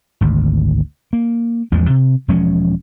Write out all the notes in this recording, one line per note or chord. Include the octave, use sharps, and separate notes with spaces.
G#1 D2
A#3
A1 E2 F3 G#3
C3
E1 F3 G#3 C#4